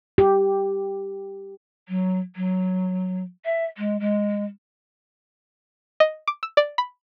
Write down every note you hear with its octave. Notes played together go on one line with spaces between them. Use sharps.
G4
F#3
F#3
E5
G#3
G#3
D#5
D6
E6
D5
B5